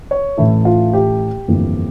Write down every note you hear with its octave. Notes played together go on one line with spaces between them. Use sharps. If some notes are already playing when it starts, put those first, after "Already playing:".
C#5
A1 A2 E3 A3 E4
F4
G4
G1 F2 E3 A#3